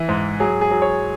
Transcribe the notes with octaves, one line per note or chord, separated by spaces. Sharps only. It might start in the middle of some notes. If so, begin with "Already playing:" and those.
Already playing: E3
G#2
F#3 G#4
G#4
F#3
C#5